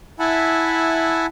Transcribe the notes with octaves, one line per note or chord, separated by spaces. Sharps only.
E4 E5 F#5 G#5 A5 B5